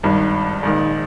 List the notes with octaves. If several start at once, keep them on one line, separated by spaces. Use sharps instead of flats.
G#1 G2 D#3
A#1 G#2 D#3